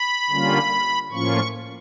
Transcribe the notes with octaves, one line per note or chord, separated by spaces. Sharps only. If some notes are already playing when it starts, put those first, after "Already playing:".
Already playing: B5
D3 G3 A#3 C#4 F4
A2 F3 A#3 C#4 F4 C#6